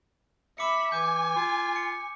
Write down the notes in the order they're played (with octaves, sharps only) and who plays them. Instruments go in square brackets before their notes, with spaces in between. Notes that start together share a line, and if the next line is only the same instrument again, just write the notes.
[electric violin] E5 B5 [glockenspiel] D6 C#7
[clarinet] E3 [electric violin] G#5 [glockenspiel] D6 G6
[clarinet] F4
[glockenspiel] C#7